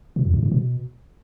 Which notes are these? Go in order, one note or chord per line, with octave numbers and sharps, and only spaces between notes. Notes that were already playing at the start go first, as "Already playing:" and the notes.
B2
E2
G#2
A2
B2